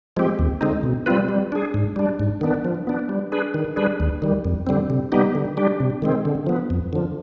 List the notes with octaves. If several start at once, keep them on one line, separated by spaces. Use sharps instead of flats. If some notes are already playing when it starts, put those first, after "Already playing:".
F3 G#3 C4 G4
D#2
D3 G#3 C4 D#4
B2
G3 C4 F4 B4
G3
D4 G#4
G#2
G3 D4
G#2
D#3 B3 D4
F3
B3 D4
G3
D4 G#4 B4
D#3
G3 D4 G#4 B4
D#2
D#3 G3
F2
D3 G3 C4
C3
G3 B3 D#4 G4
D3
G3 D4 G4
C3
D#3 G#3 C4
D3
F3 B3
F2
D3 F3